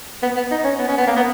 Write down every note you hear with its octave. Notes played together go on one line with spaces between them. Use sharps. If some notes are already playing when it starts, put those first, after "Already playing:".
B3
B3
D#4
C#4
B3
C#4
B3
A#3
B3